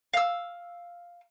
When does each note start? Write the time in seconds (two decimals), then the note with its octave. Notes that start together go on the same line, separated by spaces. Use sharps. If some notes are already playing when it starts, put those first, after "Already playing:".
0.14 F5 E6